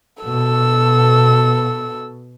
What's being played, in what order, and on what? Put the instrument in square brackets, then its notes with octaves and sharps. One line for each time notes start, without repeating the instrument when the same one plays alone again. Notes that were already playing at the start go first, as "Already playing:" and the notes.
[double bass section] B2 [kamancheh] A4 E6